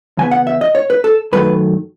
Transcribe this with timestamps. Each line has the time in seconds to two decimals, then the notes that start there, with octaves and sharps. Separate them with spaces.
0.17 E2 C#3 B3 G#5
0.31 F#5
0.47 E5
0.61 D#5
0.75 C#5
0.90 B4
1.04 A4
1.33 F#2 D#3 F#3 A3 B4